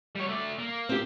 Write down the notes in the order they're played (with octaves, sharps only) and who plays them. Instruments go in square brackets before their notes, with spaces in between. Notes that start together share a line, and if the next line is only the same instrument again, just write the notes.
[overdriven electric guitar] G3 C#5
A3 D5
A#3
[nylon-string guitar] C4 G4